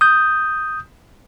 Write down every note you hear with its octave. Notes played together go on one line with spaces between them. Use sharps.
D#6 G6